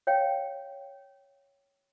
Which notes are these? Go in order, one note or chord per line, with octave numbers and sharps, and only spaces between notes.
C#5 F5 G5